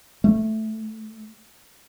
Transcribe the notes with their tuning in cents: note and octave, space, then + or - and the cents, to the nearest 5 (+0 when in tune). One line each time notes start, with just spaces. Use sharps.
A3 -5